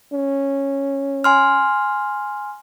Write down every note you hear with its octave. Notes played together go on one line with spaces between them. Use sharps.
C#4
G#5 C6 F6